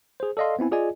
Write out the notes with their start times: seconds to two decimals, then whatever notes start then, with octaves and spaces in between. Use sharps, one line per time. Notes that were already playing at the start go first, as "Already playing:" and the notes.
0.20 G#4 C5
0.37 A4 D5 D#5 F5 C6
0.59 B3 C4 E4 G#5
0.71 F4 G#4 D5 D#5 G#5